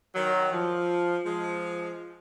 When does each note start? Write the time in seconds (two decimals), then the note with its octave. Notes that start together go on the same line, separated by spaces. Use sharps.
0.15 D#3 F#3
0.52 F3
1.25 F3 G#3